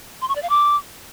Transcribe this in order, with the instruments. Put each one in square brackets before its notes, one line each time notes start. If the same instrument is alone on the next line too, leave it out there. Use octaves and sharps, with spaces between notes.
[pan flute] C6
C#6
D5
F5
D6